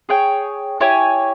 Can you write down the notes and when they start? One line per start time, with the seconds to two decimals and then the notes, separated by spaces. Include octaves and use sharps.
0.09 G#4 C#5 G5
0.80 E4 G4 C#5 G#5